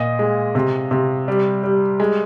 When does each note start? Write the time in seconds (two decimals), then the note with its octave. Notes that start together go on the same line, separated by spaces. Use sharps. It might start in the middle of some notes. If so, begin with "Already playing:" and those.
Already playing: A#2 D#5
0.19 G#3
0.55 C3
0.91 C3
1.28 G3
1.63 G3
2.00 G#3